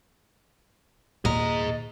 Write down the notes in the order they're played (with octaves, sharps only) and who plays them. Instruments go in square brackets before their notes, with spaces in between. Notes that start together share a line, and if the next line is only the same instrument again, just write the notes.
[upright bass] D#2 [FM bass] A#2 [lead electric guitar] G#4 A#5 [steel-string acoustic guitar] D#5